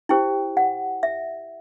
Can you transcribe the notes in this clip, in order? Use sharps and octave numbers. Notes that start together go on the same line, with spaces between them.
E4 G4 C5 G5
F#5
E5